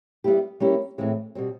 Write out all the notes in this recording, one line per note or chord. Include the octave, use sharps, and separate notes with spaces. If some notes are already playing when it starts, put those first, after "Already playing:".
G3 B3 E4 G4
G3 A#3 C#4 E4 G4
A2 E3 G#3 C4
B2 G3 C4